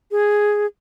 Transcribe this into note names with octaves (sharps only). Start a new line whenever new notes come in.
G#4